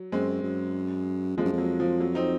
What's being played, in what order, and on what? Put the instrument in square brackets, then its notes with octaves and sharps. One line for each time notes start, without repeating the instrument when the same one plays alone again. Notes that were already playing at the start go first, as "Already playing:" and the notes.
Already playing: [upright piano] F#3
[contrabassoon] F#2 [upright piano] G#3 C4
[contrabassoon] F#2
[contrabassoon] F2 [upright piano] F3 G#3
[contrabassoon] F#2
F2
[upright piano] F#3
F3
F#3
C4 D#4